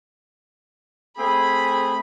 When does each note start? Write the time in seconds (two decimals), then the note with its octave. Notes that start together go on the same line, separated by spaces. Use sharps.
1.18 A3 C4 G#4 B5